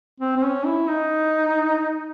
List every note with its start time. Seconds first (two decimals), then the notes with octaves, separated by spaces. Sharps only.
0.20 C4
0.37 C4
0.43 C#4
0.66 E4
0.88 D#4